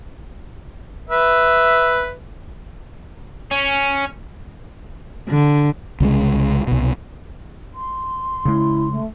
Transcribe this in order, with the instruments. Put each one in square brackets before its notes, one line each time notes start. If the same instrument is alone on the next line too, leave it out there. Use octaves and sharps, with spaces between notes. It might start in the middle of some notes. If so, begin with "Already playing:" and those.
[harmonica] B4 E5
[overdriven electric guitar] C#4
[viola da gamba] D3
[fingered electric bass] C2 C#3 E3 G#3
C2 B2
[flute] C6
[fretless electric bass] C#3 G#3 [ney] E4
[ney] A3